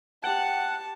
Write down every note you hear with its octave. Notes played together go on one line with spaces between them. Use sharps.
G4 F#5 G5 A5